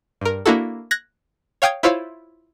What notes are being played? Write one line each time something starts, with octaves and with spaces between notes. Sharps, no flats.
G2 A#4
A#3 D4 E4 F#4 A4
F#6 G#6 A#6
C#5 F5 G5 D#6 G#6
E4 F4 C5 C#5 E5 F5